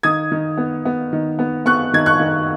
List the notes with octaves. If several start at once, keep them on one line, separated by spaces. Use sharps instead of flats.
D#3 D#6 G#6
D#3
B3
B3
D#3
B3
B3 C#6 F#6
D#3 G#6
C#6 F#6
D#3